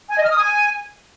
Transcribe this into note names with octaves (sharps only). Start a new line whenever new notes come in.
G#5
D#5
F6
D#6
G#5